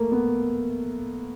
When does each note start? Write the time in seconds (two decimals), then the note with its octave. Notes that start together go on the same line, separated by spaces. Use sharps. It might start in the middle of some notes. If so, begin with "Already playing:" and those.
Already playing: A3 A#3
0.12 B3